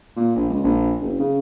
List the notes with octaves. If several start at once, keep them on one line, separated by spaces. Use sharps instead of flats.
A#2
A#1
C#2
A#1
F#1
C#3